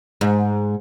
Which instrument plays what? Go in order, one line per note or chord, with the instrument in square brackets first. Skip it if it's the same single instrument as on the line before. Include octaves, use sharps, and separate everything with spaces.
[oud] G#2